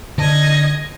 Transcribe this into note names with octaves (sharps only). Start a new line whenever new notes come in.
D3 D#5 G#6